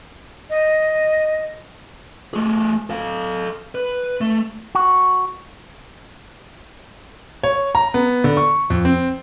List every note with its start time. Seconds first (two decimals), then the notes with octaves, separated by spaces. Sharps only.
0.50 D#5
2.34 A3 G#4
2.90 A4 F5
3.75 B4
4.21 A3
4.75 F#4
7.43 C#5
7.75 A#5
7.94 B3
8.24 D3
8.37 C#6
8.70 F2
8.85 C4